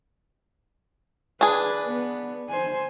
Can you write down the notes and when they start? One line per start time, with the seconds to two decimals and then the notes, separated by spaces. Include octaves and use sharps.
1.41 D4 G#4 B4
1.86 B3
2.49 C5 G#5